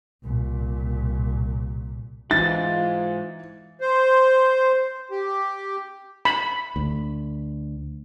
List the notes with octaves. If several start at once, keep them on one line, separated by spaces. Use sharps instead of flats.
C2 A#2
G#2 E3 F4 A6
C5
G4
B5
D2